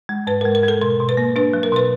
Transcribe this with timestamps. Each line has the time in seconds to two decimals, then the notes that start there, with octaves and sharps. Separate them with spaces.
0.09 G#3
0.27 G#2 B4
0.41 G#3 A#4
0.55 A#4
0.63 G#3 A4
0.82 B2 A#4
1.00 B2
1.09 B4
1.17 A#3
1.36 D4 B4
1.53 F#3
1.63 A#4
1.72 B2 B4